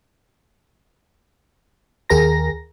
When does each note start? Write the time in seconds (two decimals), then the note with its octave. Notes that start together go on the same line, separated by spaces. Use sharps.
2.09 D#2 G#4 A#4 A#5 A#6